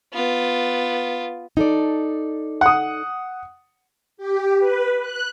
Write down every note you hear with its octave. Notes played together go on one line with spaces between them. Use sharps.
B3 F4
D#4 A4 D5
F#5 D#6
G4
B4
F#6